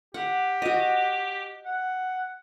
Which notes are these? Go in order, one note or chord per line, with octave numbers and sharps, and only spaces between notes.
G4 F#5
F#4 D#5
F#5